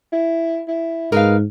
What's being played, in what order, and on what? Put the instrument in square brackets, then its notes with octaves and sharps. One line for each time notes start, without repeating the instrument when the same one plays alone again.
[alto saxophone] E4
E4
[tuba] G#2 [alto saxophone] G#3 [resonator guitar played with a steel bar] A#4 B4 F5